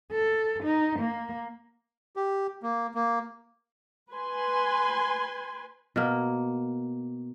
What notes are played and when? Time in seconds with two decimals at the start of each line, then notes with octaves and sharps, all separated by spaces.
0.12 A4
0.64 D#4
0.99 A#3
2.16 G4
2.63 A#3
2.95 A#3
4.11 B4 G#5 C6
5.96 B2 A#3